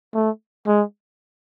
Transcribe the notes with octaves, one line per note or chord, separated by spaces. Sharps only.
A3
G#3